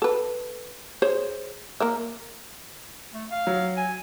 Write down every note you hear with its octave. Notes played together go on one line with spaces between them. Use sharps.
A4 B4
G#4 C5 C#5
A#3 A#4 E5
A3
F5
F#3
G#5